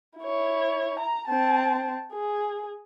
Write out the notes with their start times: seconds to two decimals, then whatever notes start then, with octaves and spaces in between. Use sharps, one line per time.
0.19 E4 C#5
0.99 A#5
1.28 C4 A5
2.13 G#4